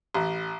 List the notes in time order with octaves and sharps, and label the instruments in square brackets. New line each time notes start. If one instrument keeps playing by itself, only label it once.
[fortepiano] A1